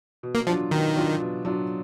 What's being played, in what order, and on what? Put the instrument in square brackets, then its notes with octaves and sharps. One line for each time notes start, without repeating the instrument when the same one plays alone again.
[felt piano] B2
[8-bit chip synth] A#3
[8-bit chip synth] F3 [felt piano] F#3 D4 F4
[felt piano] B2 [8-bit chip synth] D#3
[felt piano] F#3 D4 F4
B2
F#3 D4 F4